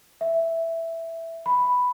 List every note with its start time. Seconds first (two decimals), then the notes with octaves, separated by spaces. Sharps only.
0.21 E5
1.46 B5